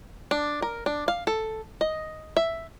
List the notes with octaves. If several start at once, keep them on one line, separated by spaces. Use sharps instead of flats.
D4
A#4
D4
F5
A4
D#5
E5